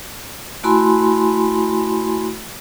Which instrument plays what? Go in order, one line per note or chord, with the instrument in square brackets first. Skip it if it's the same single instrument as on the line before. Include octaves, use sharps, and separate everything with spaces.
[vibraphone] A3 E4 F#4 G#5 B5 C6